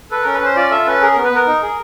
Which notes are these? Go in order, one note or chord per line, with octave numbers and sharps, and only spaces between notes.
A4 B4
C#4 A#4
B4
C#4 C5
F4 D5
A4 E5
C#4 B4
G#4 A#4
B3 A#4
B4
B3 A#4
D#4
G#4